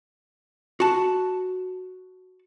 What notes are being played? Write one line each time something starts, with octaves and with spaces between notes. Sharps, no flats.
F#4 A5